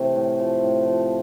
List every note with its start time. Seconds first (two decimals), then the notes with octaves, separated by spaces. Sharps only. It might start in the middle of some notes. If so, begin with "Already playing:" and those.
Already playing: C3 E3 A3
0.16 A2
0.40 F3
0.63 A2
0.87 F3